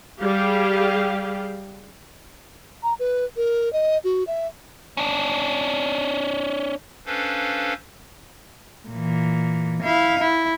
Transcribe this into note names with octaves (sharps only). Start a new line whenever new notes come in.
G3 G4 G#4 F5
A#5
B4
A#4
D#5
F#4
E5
C#4 D4
C#4 D4 A4 B4 C5 F5
A#2 E3
E4 F5
E4